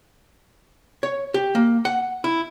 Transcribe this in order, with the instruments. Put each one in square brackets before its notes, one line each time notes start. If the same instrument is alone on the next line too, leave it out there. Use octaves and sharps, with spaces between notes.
[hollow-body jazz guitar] C#5
G4
A#3
F#5
E4